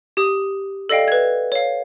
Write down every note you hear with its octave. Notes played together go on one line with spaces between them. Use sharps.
G4 D#6
A4 D5 D#5 F5 G5
B4 G#6
C#5 F5